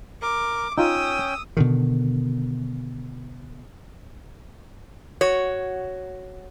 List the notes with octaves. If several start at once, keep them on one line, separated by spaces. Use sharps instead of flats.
A#4 D6
C#4 D#4 F4 G5 D#6 E6
B2 D3 D#3
F#4 C#5